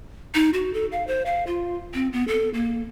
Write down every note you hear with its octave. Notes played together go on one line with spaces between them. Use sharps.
D#4
F#4
A4
F5
C5
F5
F4
C4
B3
A4
A#3